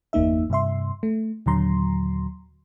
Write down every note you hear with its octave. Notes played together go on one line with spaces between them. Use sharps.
G1 E2 A#3 D#4 E5
G2 C3 E5 C6
A3
D#2 A#2 D3 F#3 A#5 C6